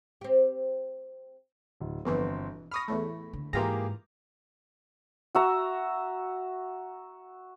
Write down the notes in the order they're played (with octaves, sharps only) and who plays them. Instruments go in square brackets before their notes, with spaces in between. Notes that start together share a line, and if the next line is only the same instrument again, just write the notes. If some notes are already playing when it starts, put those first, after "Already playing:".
[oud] C4 G4
[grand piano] D1
[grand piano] G1 C4 [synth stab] F2 B2 E3
[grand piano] B5 C#6 A#6 [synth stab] D#6 F6
[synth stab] E2 A2 A3
[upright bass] D3
[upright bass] G#2 [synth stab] E3 F4 A#5 [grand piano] A#3 G4 G#4
[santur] F#4 E5 A#5